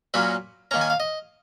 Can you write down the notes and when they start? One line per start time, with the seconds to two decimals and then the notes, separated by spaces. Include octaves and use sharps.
0.14 A#2 F#3 A#3 C#4 B5
0.71 D#3 A#3 C#4 A#5
0.81 G#5
0.90 F5
1.00 D#5